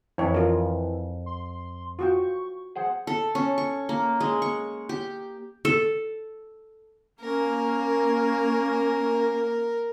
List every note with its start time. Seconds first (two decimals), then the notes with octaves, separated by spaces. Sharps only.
0.18 F2 E3 E4 C#5
0.34 F4 A#4
1.26 C6
1.99 F4 F#4 G5 C#6
2.76 G#4 C5 F#5 G5
3.07 A4
3.35 C#4
3.58 C#6
3.89 A#3
4.20 G#3
4.42 C#6
4.89 G4
5.65 A4
7.21 A#3 C#4 A#4